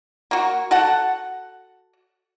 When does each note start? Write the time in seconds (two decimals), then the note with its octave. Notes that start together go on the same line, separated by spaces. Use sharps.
0.31 A#3 F#4
0.71 F#4 A4 F#5